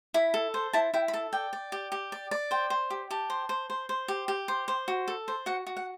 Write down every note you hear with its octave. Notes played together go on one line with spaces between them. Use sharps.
E4 B5
A4
C5
E4 A5
E4 G5
B5
A4 A5
D5 G5
D5
G4
G4
D5
D5
C5 G5
C5
G4
G4 A5
C5
C5
C5
C5
G4
G4
C5
C5
F#4
A4
C5
F#4 F#5
F#4
F#5